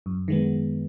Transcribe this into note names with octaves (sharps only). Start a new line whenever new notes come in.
F#2
D#3 G#3 B3